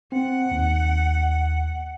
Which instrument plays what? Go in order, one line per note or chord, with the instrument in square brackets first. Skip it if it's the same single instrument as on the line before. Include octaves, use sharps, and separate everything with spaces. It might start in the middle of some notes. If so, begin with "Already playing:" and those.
[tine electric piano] C4 [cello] F#5
[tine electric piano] D#2